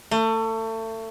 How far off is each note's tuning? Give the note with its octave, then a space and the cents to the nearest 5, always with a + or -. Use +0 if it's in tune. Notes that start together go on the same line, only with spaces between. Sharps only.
A3 +30